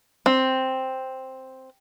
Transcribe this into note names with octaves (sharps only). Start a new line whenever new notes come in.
C4